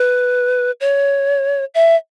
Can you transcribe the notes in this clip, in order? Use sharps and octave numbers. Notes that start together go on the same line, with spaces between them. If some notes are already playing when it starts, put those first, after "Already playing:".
Already playing: B4
C#5
E5